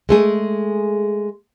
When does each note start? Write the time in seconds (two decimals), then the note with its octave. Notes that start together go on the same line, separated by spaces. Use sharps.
0.09 G#3 A3 G#4